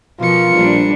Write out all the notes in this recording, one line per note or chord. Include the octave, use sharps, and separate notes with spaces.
B2 F3 F4 A#4 C#7
A#1 G3 D4